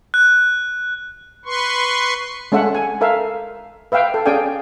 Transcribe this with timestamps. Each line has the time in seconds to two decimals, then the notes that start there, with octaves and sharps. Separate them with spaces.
0.14 F#6
1.45 B4 C6 C#6
2.52 G#3 C#4 A4 E5 F#5
2.75 G#5
3.01 A4 A#4 E5 F5
3.92 B4 E5 F5 G5
4.14 A4
4.26 C#4 G#4 D5 F5 G5 G#5